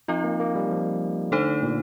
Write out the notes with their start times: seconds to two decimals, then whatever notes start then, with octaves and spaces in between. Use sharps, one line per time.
0.08 F3 C4 D#4 F4
0.24 A#3
0.40 A#3
0.55 G3
0.71 F3
1.31 D3 A3 D#4 A4 C5
1.63 A#2